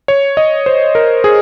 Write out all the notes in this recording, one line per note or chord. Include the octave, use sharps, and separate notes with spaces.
C#5
D#5
C5
A#4
G#4